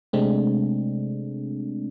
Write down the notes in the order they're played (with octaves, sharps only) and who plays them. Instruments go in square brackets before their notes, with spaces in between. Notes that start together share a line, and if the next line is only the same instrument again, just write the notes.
[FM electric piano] C3 G#3 A3 C4 D4